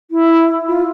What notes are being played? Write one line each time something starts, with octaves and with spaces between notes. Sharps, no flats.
E4
F4